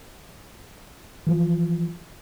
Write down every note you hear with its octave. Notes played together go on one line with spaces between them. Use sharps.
E3 F3